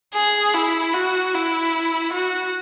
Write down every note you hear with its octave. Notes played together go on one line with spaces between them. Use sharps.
G#4
E4
F#4
E4
F#4